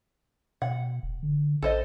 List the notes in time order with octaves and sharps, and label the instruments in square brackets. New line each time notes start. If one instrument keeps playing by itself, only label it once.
[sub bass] B2 [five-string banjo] F#5
[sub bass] E1
D3
[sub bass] A1 [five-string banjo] A4 C5 D#5